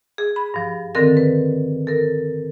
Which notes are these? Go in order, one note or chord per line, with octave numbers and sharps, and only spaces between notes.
G#4
B5
G2 F3
D3 D#3 C4 A4 A#4 A#6
B4
A4 A#4